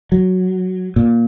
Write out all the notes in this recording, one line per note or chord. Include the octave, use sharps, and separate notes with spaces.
F#3
A#2